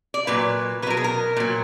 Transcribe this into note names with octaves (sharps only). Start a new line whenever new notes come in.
D5
A#2 F#3 B4
B2 F#3 A#4 B4
G#4
A#4
A#2 F#3